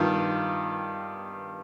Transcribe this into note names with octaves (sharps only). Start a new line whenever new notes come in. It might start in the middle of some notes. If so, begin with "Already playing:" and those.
Already playing: G2 D#3 F4